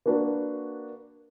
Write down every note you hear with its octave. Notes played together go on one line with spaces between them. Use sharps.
A#3 D4 F#4 B4